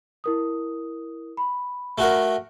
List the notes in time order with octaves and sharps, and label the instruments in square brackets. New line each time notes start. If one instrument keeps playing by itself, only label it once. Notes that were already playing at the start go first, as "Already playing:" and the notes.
[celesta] E4 A#4 D#6
B5
[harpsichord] A3 F#4 A#4